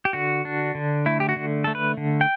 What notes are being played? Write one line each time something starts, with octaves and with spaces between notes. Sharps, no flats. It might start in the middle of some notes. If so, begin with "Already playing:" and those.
G4
D3 F#4
D4
D3
A3 E4
G4
F#4
D3
A3 A4
B4
D3
G5